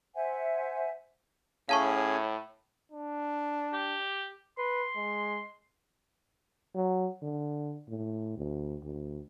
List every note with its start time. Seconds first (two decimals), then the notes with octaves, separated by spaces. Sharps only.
0.15 C5 E5 F#5 G#5
1.69 A2 C#4 G#4 F5 A5 C#6
2.92 D4
3.73 G4
4.58 B4 C6
4.97 G#3
6.75 F#3
7.22 D3
7.89 A2
8.37 D2
8.84 D2